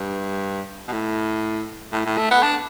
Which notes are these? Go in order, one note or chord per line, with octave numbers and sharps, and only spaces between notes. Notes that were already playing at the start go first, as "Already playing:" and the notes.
Already playing: G2
B2
A2
A2
A2
A3
B3
D4